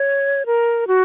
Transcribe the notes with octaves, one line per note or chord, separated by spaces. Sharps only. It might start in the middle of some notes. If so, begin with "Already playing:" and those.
Already playing: C#5
A#4
F#4